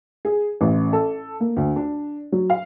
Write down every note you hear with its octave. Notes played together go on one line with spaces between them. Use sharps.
G#4
A1
A4
A#3
D2
D4
F#3
F5